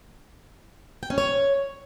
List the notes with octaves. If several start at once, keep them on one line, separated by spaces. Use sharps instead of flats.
G5
C#4
C#5